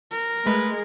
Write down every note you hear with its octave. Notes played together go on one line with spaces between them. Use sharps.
A#4
G#3 A3 B4